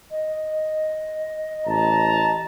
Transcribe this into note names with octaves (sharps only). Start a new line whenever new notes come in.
D#5
A1 A5 A#5